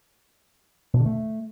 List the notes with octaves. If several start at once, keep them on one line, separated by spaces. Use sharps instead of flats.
B2
D3
A3